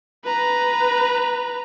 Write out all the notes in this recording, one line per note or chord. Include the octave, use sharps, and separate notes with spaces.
B4 A#5